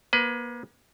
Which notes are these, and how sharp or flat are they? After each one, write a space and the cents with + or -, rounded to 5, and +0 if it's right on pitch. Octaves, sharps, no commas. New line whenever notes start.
A#3 +40 B4 +25